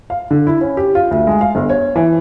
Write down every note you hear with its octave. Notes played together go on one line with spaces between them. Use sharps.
F5
D3
E4
C#4
G4
F4
D2
G#3
F5
G1
C#5
E3